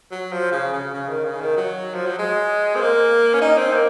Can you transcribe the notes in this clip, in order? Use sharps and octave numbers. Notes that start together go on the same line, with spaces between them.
F#3
F3
C#3
C#3
C#3
D#3
C#3
D#3
F#3
F3
F#3
G#3
C4
A#3
C#4
D#4
C4
A#3